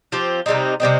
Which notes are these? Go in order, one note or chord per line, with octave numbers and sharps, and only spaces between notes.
F3 C4 G4
C3 G3 C4 D#4
C3 G3 C4 D#4